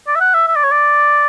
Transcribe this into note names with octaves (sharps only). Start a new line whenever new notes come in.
D5
E5
F#5
E5
E5
D5
C#5
D5